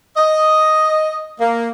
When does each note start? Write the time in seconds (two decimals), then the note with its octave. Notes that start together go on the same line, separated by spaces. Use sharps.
0.17 D#5
1.40 A#3